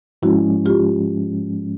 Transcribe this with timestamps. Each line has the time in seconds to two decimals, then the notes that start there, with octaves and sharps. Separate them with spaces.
0.22 G#2 F3 G#3 C#4 E4 F#4
0.66 F4 G4